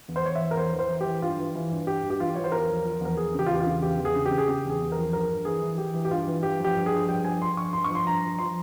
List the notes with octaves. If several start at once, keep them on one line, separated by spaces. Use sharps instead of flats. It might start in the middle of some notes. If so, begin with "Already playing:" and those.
E2
C5
E2 C#5
E5
E3
A#4
E2 C5
E3
C5
E3
E3 G4
G2 F4
E3
E3
G2
G2 G4
G2
G4
E3 F4
E3 C#5
C5
E2 A#4
F3
F3
E2 A#4
E2 G#4
C#3 G4
F4
E2 G4
F4
C#3
E2 G4
E2
G#4
C#3
G4
C#3
G#4
C#3 G4
E2
G#4
E2
A#4
F3
G2 A#4
G2
E3 G#4
E3
E3 G4
E3
G4
G2 F4
E3
G2 G4
F3
G4
G2
G#4
F3
G2 G5
F3 G#5
F3 C6
G2 C#6
G2 C6
C#6
F3
C6
G2 A#5
F3
F3 C6